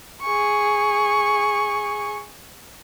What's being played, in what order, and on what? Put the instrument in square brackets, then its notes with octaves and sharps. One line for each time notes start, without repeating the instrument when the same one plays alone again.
[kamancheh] G#4 C#6